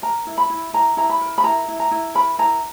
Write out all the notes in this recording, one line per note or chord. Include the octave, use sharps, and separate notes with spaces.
A#4 A#5
E4
B5
E4
E4 A#5
E4 A#5
B5
A#4
B5
E4 A#5
E4
A#5
E4
A#4 B5
E4 A#5